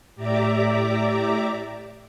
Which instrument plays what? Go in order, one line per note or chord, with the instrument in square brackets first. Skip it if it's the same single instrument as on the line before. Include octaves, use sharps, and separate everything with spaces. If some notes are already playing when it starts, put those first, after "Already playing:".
[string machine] A2 G4 D5 E5 A#5 D6